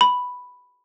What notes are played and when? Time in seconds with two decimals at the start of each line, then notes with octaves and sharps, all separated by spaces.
0.01 B5